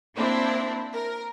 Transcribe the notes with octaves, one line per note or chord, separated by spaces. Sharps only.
A#3 C4 D4 E4
A#4